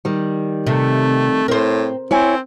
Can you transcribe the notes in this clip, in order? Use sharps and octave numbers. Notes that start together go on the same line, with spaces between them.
D#3 G3
C3 A3
A2 C4 A#4 C5
C4 E4 C#5 G#5